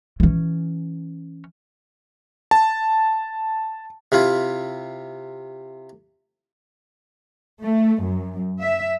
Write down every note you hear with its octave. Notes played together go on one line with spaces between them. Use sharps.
E3 C#4
A5
C3 E4 F4
A3
F#2
E5